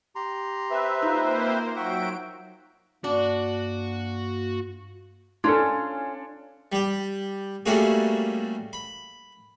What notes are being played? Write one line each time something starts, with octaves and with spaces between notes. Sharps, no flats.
G4 A#5 C6
C4 B4 E5
A#3 D#4 F4 C5
F#3 F#4 E5 F#5 G5 D7
G2 A#3 D4 F#4
C#4 D4 F4 A4
G3 G4
G3 A3 A#3 C#4 F#4 G#4
B5